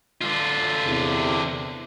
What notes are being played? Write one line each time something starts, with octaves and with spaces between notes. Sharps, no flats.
D3 F4
E2 C3